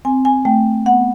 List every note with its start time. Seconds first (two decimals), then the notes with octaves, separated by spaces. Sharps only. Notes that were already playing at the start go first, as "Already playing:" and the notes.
0.05 C4 G#5
0.25 G#5
0.45 A3 G5
0.86 B3 F#5